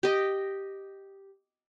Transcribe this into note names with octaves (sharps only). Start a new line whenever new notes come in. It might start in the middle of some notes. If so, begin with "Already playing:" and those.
G4 D#5